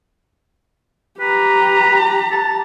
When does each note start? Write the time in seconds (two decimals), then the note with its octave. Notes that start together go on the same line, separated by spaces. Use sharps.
1.20 G4 B4 A#5
2.31 A5